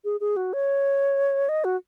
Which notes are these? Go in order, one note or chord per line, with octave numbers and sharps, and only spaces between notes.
G#4
G#4
F#4
C#5
D#5
F#4